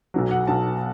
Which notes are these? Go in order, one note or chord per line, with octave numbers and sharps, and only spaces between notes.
B1 B2 F#3
F#5
B1 B2 F#3 A5